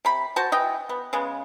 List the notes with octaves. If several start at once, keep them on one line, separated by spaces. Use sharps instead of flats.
C3 B5
F#4 C5 A5
E3 D#5 G5
B3
C#3 G#3 B3